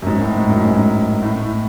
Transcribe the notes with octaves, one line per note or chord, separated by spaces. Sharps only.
F#2
G#2
A2
G#2
F#2
G#2
A2
A2